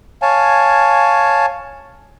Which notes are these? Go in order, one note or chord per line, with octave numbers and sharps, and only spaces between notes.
C#5 F5 G#5 A5